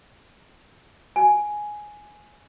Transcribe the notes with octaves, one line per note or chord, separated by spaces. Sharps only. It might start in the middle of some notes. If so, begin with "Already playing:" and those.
G#5